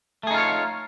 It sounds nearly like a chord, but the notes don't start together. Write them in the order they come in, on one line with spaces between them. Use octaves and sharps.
A3 G#4 D#4 F4 C#5